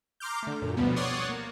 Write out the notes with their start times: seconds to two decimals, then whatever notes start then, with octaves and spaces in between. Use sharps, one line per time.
0.20 A#5 C6 D6 F6 G6
0.43 D3 A3
0.62 F#2 A#2
0.77 D2 B2 F3 G3 B3
0.96 C#5 D5 F#5 C6 C#6 D#6
1.29 A#3